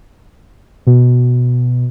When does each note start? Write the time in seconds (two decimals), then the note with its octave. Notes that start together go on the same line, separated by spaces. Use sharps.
0.87 B2